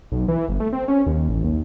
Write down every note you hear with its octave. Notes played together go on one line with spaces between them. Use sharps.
B1
E3
G1
A3
C4
C#4
D#2
A1
D#2